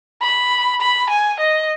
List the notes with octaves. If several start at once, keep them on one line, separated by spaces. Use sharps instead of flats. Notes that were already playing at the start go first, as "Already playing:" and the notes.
B5
B5
G#5
D#5